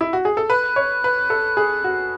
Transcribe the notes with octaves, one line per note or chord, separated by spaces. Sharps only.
E4
F#4
G#4
A4
B4 F#6
C#5
B4
A4
G#4
F#4